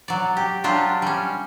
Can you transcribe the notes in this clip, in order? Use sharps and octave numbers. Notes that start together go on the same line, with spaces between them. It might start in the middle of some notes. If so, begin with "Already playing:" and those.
F#3 D5
G4
F#3 D4 F4 G4
G3 C#4